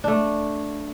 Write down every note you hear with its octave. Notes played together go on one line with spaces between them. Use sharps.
A3 D4